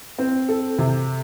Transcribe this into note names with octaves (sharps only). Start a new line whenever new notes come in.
C4
A4
C3